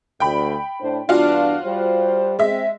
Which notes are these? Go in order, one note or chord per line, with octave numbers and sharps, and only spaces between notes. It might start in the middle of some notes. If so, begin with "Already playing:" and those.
D2 G5 B5
A2 D4 C5
E2 G2 D4 F4 F#4 F5
G3 G4 C5
G#3 C4 E5